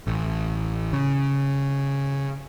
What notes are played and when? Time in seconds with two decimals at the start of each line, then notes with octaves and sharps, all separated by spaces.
0.07 A1
0.93 C#3